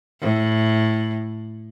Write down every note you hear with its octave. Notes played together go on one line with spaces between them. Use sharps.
A2